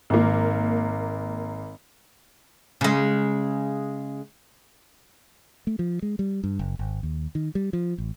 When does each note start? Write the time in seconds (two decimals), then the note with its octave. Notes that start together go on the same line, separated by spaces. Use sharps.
0.10 G#1 A#3
2.81 C#3 G#3
5.67 A3
5.79 F3
6.02 G#3
6.19 G3
6.44 G2
6.59 F#1
6.79 G#1
7.03 D#2
7.35 D#3
7.55 G3
7.73 F3
7.98 A1